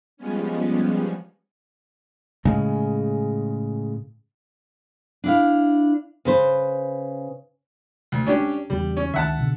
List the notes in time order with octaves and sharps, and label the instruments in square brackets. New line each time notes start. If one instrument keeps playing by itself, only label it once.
[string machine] F3 G3 G#3 B3 C#4
[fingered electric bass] A2 C#3 G#3
[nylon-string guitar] D4 E4 F5
C#3 B4 C5
[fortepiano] D2
C#4 D4 G4
[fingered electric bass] E2 C#3 [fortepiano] G3
[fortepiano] C#4
[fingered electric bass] C#2 D#3 [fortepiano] E5 F#5 A5
[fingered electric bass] B2 D3